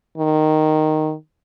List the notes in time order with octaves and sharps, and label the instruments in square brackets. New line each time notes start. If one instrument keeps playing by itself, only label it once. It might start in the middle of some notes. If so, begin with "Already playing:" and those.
[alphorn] D#3